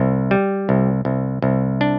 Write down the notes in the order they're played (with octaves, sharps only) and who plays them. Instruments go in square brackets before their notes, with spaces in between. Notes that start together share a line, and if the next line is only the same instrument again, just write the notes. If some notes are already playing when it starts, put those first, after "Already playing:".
Already playing: [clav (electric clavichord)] C2
G3
C2
C2
C2
D4